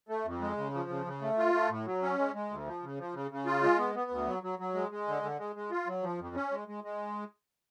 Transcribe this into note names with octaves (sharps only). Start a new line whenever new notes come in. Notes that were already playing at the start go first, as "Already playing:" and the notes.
A3
F2
G#3
C#3
F3
C#3
C#3
A3
F4
A3
A2
F#3
C#4
G#3
G#3
D2
F3
C#3
F3
C#3
C#3
F4
G#3
B3
B3
D2
F#3
F#3
F#3
G#3
G#3
D3
D3
G#3
G#3
F4
F#3
F3
F2
C#4
G#3
G#3
G#3